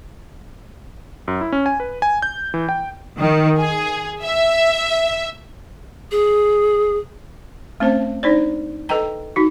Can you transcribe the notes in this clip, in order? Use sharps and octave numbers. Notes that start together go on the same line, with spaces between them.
F#2
E4
C#4
G#5
B4
G#5
G6
E3
G5
D#3
G#4
E5
G#4
A3 C4 C#4 C5 F5 A5
D4 D#4 C5 D5
A4 B4 D#5 G5 A#5
D#4 F#4